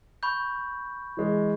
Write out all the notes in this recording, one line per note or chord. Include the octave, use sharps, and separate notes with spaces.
B5 C#6 G6
E3 G#3